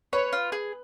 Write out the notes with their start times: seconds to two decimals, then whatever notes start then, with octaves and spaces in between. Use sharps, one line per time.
0.13 B4 C#5
0.33 F4
0.52 G#4